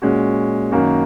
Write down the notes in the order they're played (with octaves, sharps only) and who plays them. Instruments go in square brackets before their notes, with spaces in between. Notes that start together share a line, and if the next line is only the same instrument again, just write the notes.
[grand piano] A#2 G#3 C#4 F#4
F#2 D#3 A#3 C#4 F#4